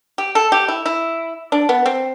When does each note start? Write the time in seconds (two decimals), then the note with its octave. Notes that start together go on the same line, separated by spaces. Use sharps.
0.18 G4
0.35 A4
0.52 G4
0.68 E4
0.86 E4
1.52 D4
1.69 B3
1.86 C4